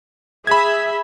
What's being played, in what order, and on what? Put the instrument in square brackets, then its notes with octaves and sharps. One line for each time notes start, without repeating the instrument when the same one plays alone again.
[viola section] G#4 E5 [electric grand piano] B5 G#6